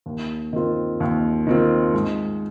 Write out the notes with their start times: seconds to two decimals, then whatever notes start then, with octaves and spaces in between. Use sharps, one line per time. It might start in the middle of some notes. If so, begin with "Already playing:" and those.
0.06 D#2
0.53 D#3 C4 F4
1.00 D#2
1.47 D#3 C4 F4
1.94 G#2